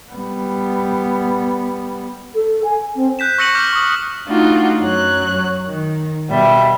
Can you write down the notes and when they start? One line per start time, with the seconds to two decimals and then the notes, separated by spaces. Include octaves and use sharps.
0.12 G3 B3
2.35 A4
2.64 G#5
2.95 C4
3.19 F#6 G6 B6 E7
3.38 C#6 E6 A#6 C#7 D#7 F#7
3.55 D6 F6 G6 F#7
3.73 C#6 D#6
4.26 A3 D4 D#4 F4 F#4
4.80 F#2 F#3 F#6
5.64 D#3
6.28 B2 G3 E5